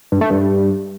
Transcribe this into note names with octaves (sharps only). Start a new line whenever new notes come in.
G2
A3
G2